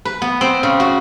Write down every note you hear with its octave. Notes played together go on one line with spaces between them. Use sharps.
B4
B3
C4
C#3
F#4